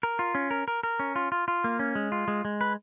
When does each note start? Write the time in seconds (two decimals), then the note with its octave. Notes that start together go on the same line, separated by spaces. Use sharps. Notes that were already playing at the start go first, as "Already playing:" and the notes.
0.03 A#4
0.19 F4
0.35 C#4
0.51 A#4
0.68 A#4
0.83 A#4
1.00 C#4
1.16 F4
1.32 F4
1.48 F4
1.64 A#3
1.79 C#4
1.95 G#3
2.12 F4
2.28 G#3
2.45 G#3
2.61 B4